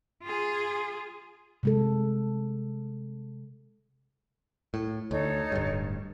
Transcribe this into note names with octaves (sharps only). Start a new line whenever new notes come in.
F4 G#4
C3 G#3 A4
A2
D2 D#4 A4 C#5
D1 G2